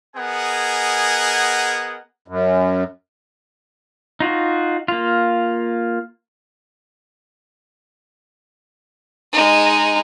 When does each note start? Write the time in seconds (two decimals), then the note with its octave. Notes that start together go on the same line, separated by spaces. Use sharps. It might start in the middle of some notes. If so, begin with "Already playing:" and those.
0.16 B3 G#4 A#4 D#5 F#5 G#5
2.28 F#2
4.20 D#4 F4 F#4
4.88 A#3 F4
9.33 G#3 D#4